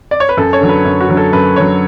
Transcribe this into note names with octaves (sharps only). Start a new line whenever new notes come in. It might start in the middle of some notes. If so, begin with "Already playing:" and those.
D5
C#5
B4
F#2 A4
C#5
D3 F#3
B4
F#2
F#4
D3 F#3
A4
F#2 B4
D3 F#3 C#5